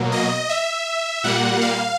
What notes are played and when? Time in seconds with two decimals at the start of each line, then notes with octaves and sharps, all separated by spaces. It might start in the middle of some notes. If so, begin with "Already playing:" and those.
Already playing: B2 F#3 A#3
0.12 D#5
0.49 E5
1.24 A#2 G3 A#3 F#5
1.61 F5